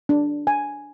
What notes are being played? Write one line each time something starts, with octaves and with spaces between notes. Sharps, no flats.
D4
G#5